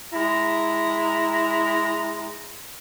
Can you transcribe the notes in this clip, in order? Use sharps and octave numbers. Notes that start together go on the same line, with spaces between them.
G#3 E4 A#5